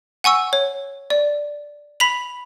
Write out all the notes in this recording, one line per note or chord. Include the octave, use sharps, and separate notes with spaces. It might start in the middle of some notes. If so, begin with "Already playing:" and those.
F#5 G#5 C#6 E6
C#5
D5
B5 B6 F7 F#7